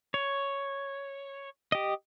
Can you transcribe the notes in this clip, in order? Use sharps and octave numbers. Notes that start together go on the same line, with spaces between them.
C#5
G4 D#5